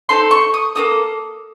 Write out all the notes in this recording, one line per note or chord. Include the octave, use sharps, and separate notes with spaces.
C4 D#4 A4 C6
C#6
D#6
A#3 D#4 A4 D#6